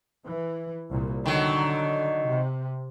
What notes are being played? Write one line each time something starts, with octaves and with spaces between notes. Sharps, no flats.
E3
C2 A#2
D3 D#3 F#3
C3